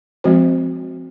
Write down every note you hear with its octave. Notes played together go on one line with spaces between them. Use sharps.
F3 G#3 C4 F#4 C5